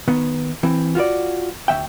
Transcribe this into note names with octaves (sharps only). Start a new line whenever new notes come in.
D#3 B3
E3 C4
F4 F#4 B4 D5
D2 F3 E5 G5